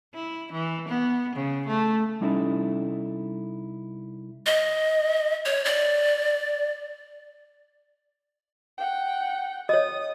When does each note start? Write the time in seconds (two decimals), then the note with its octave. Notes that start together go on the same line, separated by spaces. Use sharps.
0.14 E4
0.52 E3
0.88 B3
1.35 C#3
1.67 A3
2.20 C2 G3 C#4 D#4 E4 A4
4.46 D#5
5.45 C#5
5.65 D5
8.78 F#5 G5
9.69 C#5 D#5 D#6